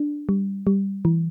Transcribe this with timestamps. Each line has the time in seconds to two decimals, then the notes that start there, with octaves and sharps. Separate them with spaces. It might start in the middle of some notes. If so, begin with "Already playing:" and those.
Already playing: D4
0.29 G3
0.67 G3
1.05 E3